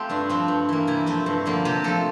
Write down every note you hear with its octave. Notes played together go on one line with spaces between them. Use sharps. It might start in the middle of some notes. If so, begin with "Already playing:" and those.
Already playing: A3 C4 F4 G4
G2 D4
F3 A3 C4
G2
E3 A#3
C3 E4
F3 A3 C4
G2
D3 F3 A#3
C3 G4
F3 A3 A4